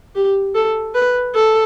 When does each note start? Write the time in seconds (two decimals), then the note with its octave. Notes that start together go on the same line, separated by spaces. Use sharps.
0.15 G4
0.55 A4
0.95 B4
1.35 A4